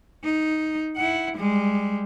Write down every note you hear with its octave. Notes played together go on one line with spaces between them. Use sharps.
D#4
E4 F#5
G3 G#3